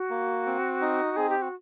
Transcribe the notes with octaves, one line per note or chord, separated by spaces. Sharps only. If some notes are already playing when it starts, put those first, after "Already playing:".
Already playing: F#4
A#3
C4
D#4
C4 G#4
G4
F#4